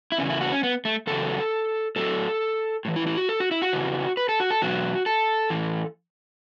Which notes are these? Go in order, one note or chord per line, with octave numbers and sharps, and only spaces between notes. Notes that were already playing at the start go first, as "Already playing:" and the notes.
E4
E2 C#3 E3 C#4
E4
F#4
C#4
B3
A3
E2 C#3 F#3 A4
A2 F#3 A4
A2 E3
E4
E4
F#4
A4
F#4
E4
F#4
E2 C#3 E3
B4
A4
F#4
A4
E2 B2 F#3 F#4
A4
A2 E3